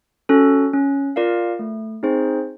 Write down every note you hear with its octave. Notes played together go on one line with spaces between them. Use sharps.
C#4 F#4 A4
C#4
F4 A#4 D5 F5
A3
C4 D#4 G#4 C5